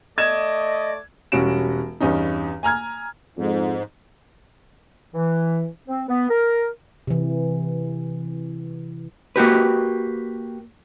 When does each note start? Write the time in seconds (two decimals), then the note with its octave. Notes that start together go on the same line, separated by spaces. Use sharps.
0.18 A3 D5 D#5 G#6 E7
1.32 E1 G3 C#4 F#4 D7 E7
2.00 E2 G2 C#4 D#4
2.63 G#5 A#5 F6 G#6
3.37 F2 G#2
5.14 E3
5.87 C4
6.08 B3
6.29 A#4
7.07 C3 E3
9.36 A#3 F#4 G4 B4